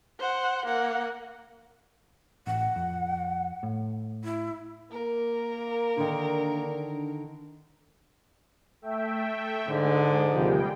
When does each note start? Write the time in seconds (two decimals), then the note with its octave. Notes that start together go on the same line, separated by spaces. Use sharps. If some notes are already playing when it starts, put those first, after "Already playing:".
0.19 C5 F#5
0.66 A#3 F#5
2.47 A1 F#5
2.76 F2
3.63 A2
4.24 E4
4.92 A#3 A#4
5.97 D3 D#3 D4
8.82 A3 E5 G5
9.69 G#2 D3 G#3
10.33 D#2 C3 F3 G3 G#3 G5